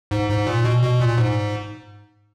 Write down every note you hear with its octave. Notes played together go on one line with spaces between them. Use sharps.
G#2
G#2
A#2
B2
B2
A#2
G#2